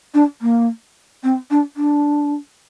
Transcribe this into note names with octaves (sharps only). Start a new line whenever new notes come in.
D4
A#3
C4
D4
D4